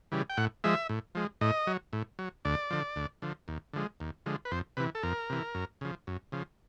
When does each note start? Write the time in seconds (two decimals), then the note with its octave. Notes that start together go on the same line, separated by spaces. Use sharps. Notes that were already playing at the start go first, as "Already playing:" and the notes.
0.12 C#3 E3 G3
0.30 G5
0.37 A2 F#5
0.64 F3 G#3 E5
0.89 A2
1.15 F3 G#3
1.41 A2 D#5
1.67 F#3
1.93 A2
2.19 F#3
2.45 D2 D5
2.71 D3 F3
2.96 D2
3.22 D3 F3
3.48 D#2
3.73 D3 F3 G#3
4.00 D#2
4.26 D3 F3 G#3
4.45 B4
4.52 F2 C5
4.77 C3 E3 B4
4.95 A4
5.03 F2 A#4
5.30 C3 E3
5.55 F#2
5.81 C#3 F3
6.07 F#2
6.32 C#3 F3